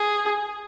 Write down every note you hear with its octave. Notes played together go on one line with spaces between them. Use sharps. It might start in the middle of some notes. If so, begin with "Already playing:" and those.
Already playing: G#4